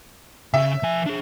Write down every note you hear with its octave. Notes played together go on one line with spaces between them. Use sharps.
C#3 C#4 E5
F3 G#5
D4 G#4